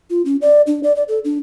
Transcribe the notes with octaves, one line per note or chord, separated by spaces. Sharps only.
F4
C#4
D5
D4
D5
D5
A4
D4